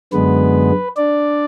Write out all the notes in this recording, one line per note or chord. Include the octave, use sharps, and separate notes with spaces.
F#2 D3 G#3 B3 B4
D4 D5